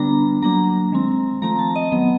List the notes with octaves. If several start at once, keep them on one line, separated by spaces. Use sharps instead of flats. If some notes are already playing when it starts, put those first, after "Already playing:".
Already playing: D3 G3 B3 D4 A#5
F#3 A#3 D4 A#5
D#3 G#3 C4
F3 A3 C4 A#5
A5
D#5
D#3 F#3 B3